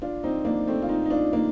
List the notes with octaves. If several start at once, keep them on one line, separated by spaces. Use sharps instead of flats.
D4 F4
C4 D#4
A#3 D4
A3 C4
F4
C4 D#4
D#4
D4 F4
A#3 D4